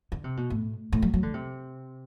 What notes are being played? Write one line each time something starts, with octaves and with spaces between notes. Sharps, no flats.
D3
C3
B2
A2
A2
F#3
F#3
D3
C3